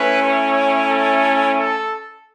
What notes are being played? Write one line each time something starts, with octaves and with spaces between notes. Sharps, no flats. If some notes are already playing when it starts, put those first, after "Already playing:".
Already playing: A3 C#4 E4 B4
C#5
A4
A4